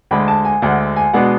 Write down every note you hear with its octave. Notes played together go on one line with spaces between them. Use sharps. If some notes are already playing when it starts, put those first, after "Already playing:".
D2 D3 G#3 B5
A5
G#5
D2 D3 G#3 F#5
G#5
B2 G#3 B3 D4 F#5